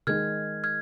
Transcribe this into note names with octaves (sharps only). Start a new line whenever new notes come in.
D#3 G#3 D#4 G#4 F6 G#6
F6 G#6